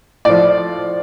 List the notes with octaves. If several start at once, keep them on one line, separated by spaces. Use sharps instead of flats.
A2 F3 D5